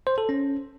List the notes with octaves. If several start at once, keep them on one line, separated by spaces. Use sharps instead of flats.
C5
A4
C#4